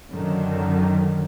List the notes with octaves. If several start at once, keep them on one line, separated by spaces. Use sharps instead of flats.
F#2 D3 D#3